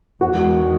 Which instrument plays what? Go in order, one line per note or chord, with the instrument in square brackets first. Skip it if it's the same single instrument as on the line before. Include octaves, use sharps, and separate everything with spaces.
[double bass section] E2 D#3 G#3 [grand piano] F#4